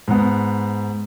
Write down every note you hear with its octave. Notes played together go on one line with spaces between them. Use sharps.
G#2 B3